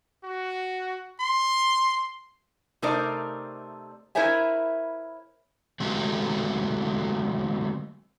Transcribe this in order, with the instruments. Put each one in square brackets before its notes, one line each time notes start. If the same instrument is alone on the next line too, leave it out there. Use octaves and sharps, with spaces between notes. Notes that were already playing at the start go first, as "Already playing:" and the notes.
[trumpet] F#4
C6
[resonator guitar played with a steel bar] C3 A3 D#4 A#4 C5 D5
E4 A#4 C5 C#5 E5 G#5
[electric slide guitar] D3 F#3 G#3 A3 C4 G4